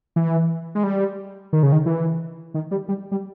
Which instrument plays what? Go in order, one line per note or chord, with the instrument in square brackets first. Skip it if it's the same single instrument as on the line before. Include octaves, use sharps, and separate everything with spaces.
[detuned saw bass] E3
G#3
G3
D#3
C#3
D#3
E3
D#3
G3
G3
G3